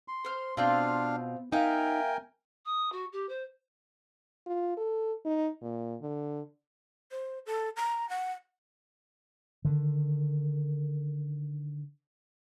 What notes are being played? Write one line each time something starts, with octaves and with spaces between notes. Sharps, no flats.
C6
C5 F6
B2 C4 D4 F4 F5 G5
D#4 A#4 E5 F5 G5 G#5
D#6
F#4
G4
C5
F4
A4
D#4
A#2
D3
C5
A4
A#5
F#5
D3 D#3